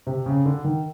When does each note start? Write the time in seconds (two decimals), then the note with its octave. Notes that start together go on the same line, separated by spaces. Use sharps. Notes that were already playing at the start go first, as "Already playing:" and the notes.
0.07 C3
0.26 C#3
0.45 D3
0.64 D#3